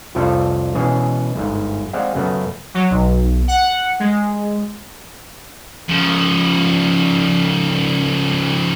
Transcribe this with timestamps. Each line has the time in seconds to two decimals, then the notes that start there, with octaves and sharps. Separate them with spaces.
0.15 C2 F2 F3 G3 F4 A4
0.75 B2 E3 G#3 C#4 G#4
1.36 G1 G#2
1.93 G#3 C4 D5 F5 F#5
2.15 F#2 C#3 A3 B3
2.74 F#3
2.91 B1
3.48 F#5
4.00 G#3
5.89 C#3 F3